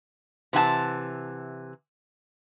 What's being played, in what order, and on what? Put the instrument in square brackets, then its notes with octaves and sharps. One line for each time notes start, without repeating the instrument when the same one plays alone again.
[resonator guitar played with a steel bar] C3 E3 F#5 G#5 A5